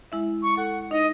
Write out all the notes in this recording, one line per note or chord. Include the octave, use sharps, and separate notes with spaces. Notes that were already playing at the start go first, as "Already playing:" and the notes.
G#3 E4 E5
C#6
A4 F#5
D#4 D#5